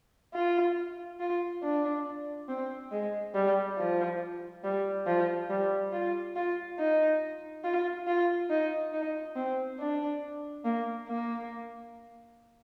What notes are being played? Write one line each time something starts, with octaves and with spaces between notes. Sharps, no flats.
F4
F4
D4
C4
G#3
G3
F3
G3
F3
G3
F4
F4
D#4
F4
F4
D#4
D#4
C4
D4
A#3
A#3